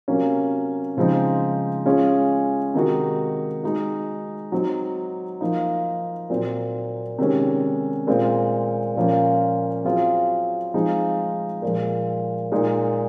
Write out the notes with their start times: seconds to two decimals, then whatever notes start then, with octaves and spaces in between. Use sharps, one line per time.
0.08 C3 F#3 A#3 C#4
0.97 C#3 F3 G#3 C4 D#4
1.85 G#3 C#4 F4 G#4
2.74 C3 D#3 G#3 D#4 F#4
3.63 G#3 D#4 F#4
4.52 F#3 C4 D#4
5.41 F3 A#3 D#4
6.30 A#2 F#3 C4
7.19 C3 D#3 G#3 C#4
8.07 A#2 G#3 C4 F4
8.96 A#2 F3 A#3 C#4 F4
9.85 F#3 C4 F4 G#4
10.74 F3 G#3 C4 D#4 G#4
11.62 A#2 F3 G#3
12.52 A#2 G#3 D#4